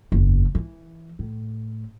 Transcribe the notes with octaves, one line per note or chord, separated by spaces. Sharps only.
F#1 E2
E3
A2